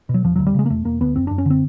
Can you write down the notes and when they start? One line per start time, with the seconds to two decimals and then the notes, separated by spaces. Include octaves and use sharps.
0.09 B2
0.14 F#3
0.24 E1 F3
0.36 D2 F#3
0.47 G3
0.54 C#3 G#3
0.66 A#3
0.70 E1 A3
0.85 E1 A#3
1.01 D2 B3
1.15 F#1 C4
1.27 F#2 D4
1.38 C#4
1.45 D3 C4